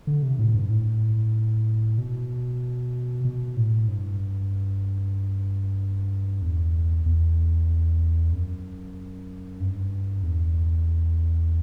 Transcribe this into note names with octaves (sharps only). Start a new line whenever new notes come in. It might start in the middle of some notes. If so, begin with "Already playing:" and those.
D3
C3
A2
G2
A2
B2
B2
A2
G2
E2
E2
F#2
G2
E2